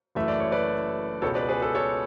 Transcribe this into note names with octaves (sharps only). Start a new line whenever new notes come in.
F#1 F#2 E3 A3 E5
D5
C#5
B4 D5
C#2 B2 G#3 A4 C#5
B4 D5
G#4 B4
A4
A4 C#5